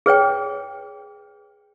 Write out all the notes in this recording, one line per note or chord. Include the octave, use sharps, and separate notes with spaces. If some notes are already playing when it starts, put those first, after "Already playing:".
G#4 B4 C#5 G5